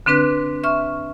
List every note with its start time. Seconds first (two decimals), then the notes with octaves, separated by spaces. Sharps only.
0.06 D3 C4 D4 B4 F#6
0.64 E5 C#6 F6